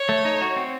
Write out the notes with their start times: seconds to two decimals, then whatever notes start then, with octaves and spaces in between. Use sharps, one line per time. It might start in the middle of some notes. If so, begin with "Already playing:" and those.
Already playing: C#5
0.09 A3
0.25 D#4
0.41 F#4
0.56 C4